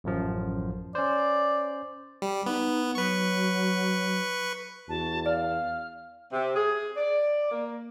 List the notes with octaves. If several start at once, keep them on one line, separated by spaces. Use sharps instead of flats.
A1 F#2 F3
C#4 C5 D5
G3
B3 D#4
F#3 B4 C#6
E2 F#4 A5
D5 F5 F6
C3
G#4
D5
A#3